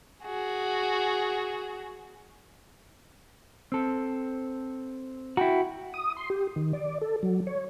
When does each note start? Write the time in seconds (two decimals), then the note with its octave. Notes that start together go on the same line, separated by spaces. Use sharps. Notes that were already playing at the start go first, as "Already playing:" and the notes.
0.24 F#4 G#4
3.72 C4 A4
5.37 E4 F#4 G5 A#5
5.94 D#6
6.17 C6
6.30 G4
6.56 D#3
6.73 D5
7.01 A4
7.23 F#3
7.47 C#5